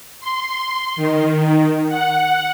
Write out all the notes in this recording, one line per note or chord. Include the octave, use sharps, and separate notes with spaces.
C6
D#3
F#5